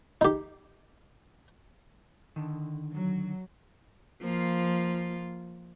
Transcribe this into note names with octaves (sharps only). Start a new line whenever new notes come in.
D#4 G4
D3 D#3
F#3
F3 A#3 F4